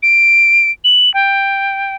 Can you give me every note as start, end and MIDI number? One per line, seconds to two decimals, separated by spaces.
0.03 0.71 98
0.84 1.12 102
1.14 1.96 79